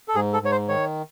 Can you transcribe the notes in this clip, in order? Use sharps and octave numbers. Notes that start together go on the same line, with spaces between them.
A4
G#2 G#4
A4
G#2 C#5
C5
D#3 C#5